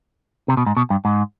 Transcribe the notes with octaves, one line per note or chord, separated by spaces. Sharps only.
C3
B2
G#2
B2
G2
G#2